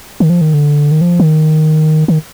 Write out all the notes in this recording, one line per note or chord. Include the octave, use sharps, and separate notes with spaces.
D#3
F3
D#3
D3
D#3
F3
D#3
D#3